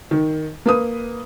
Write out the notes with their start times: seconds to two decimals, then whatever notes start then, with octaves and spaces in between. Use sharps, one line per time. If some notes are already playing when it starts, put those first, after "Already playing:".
0.11 D#3
0.66 A#3 B4 D#6